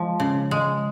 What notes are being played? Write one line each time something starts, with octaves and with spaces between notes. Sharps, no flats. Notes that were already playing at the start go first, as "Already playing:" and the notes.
Already playing: F3 G#3
C#3
G#3